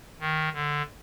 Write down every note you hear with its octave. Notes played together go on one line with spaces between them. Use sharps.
D#3
D3